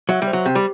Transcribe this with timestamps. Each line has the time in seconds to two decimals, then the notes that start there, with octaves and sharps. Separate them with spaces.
0.09 F#3 E5
0.22 G3
0.27 C5
0.33 F#3
0.45 C3 G4
0.55 G3